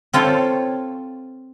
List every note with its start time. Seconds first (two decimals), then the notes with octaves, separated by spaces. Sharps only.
0.13 C4 F4 A4 C#5